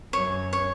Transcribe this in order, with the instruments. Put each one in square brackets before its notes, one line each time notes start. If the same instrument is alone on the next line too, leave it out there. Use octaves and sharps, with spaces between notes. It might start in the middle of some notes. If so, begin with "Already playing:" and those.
[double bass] F#2 [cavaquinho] C#5
[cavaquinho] C#5